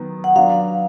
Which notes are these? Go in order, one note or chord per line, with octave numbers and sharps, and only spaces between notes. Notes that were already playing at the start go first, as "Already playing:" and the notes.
Already playing: D#3 F#3 B3
F#5
F#3 B3 D4 F5